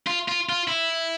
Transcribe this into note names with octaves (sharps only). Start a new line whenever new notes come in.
F4
F4
F4
E4